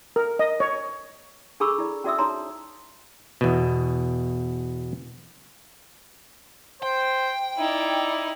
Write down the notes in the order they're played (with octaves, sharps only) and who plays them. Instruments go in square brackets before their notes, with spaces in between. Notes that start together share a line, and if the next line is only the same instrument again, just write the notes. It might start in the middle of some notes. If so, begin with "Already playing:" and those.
[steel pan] A#4
D#5
C#5
[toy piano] D4 G#4 A4 B5 C#6 E6
E4 D5
C#4 F#4 D5 E5 D#6 E6
D#4 C#5 A#5 C6
[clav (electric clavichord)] E2 B2
[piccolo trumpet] C5 [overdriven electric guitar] G5
[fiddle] D#4 E4 [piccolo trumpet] D5